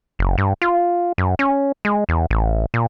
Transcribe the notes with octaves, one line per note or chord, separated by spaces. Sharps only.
F#1
G2
F4
F#2
C#4
G#3
E2
A1
A#2